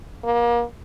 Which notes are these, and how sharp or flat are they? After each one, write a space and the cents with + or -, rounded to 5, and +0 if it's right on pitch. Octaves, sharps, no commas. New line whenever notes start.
A#3 +30